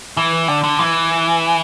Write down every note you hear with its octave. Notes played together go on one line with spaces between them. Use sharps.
E3
D3
D3
E3